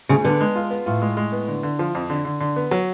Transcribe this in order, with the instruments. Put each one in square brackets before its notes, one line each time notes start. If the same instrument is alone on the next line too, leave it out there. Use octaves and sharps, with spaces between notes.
[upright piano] D2 [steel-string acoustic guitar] C#3
[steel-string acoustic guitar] D3 [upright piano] B3
[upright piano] G#3
F4
B3
[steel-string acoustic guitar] A2 [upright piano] F4
[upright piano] G#3
G#3
B3
D3
D3
F3
F2
D3
D3
D3
B3
F#3